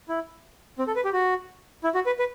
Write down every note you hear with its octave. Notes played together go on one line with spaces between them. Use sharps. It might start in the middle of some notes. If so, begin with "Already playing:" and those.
E4
C4
A4
B4
G4
F#4
E4
F#4
B4
B4